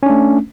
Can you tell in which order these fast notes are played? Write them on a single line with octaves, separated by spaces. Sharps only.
C#4 D4 A3